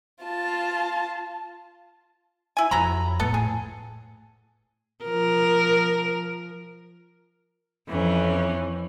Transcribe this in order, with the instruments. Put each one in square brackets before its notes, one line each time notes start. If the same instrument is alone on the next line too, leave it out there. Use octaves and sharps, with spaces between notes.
[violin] F4 A5
[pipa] E4 G#5
[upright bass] F2 [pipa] F#3 A#5 B5
[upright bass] A2 [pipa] B3 A4
[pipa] G#4
[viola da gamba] F3 A#4
[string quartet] F2 E3 C#4